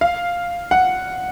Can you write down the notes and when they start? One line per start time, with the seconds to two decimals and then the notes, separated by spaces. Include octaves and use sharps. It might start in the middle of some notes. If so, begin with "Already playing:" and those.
0.01 F5
0.71 F#5